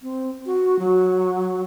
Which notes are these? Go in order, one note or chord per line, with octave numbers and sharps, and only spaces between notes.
C4
F#4
F#3